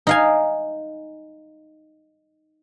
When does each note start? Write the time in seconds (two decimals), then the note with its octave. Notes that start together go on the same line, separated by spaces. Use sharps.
0.07 D#4 F5 G#5